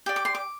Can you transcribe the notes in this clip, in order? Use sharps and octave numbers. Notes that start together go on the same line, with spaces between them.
G4 D5
D6
C6
D6